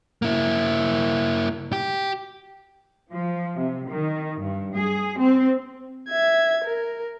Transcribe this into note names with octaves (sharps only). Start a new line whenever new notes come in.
A#3 E4
G4
F3
C3
D#3
G2
G#4
C4
E5 G#6
A#4